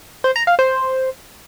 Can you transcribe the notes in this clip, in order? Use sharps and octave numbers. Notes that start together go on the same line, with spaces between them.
C5
A#5
F5
C5